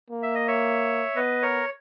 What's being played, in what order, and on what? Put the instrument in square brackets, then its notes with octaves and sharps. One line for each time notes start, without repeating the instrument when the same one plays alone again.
[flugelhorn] A#3
[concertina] E5
D#5
C#5 E5
[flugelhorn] B3 [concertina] B4 D#5
[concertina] A#4 C#5